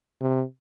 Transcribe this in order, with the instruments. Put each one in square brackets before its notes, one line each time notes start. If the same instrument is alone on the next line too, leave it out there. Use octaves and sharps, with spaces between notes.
[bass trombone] C3